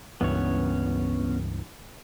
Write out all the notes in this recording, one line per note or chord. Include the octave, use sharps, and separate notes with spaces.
C#2 G2 E3 B3 C#4 C#5